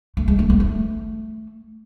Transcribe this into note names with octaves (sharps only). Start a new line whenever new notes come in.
A3
G#3
A3
B3
A3